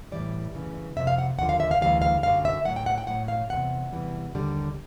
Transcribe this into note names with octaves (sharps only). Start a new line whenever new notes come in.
A2 E3 G3 D5
F#2 C#3 E3
F2 C3 F3 E5
F5
F#5
D#2 D3 F3 F#5
F5
E5
F5
D2 C#3 E3 G3 F5
F5
F#2 D3 F#3 F5
E5
A2 F#3 F#5
G5
F#5
G5
A2 F#3 F#5
F5
E2 C3 F#5
E2 C3 E3 G3
D#2 D3 G3